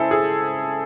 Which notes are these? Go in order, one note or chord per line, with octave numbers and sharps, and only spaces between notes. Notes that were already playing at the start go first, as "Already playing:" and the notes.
Already playing: C#3 G#3 E4 G#4 A4 C5
G#4